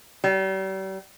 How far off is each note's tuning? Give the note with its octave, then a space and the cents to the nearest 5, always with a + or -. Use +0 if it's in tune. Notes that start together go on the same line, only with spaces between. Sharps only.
G3 -40